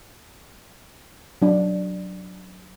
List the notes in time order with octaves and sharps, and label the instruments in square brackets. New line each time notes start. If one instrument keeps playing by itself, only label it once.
[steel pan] F#3 D4